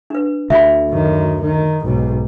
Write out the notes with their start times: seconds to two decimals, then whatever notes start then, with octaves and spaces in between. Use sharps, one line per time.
0.10 D4 B4
0.50 D2 E5 G5 B5
0.89 F#2 D#3
1.42 D#3
1.84 B1 G#2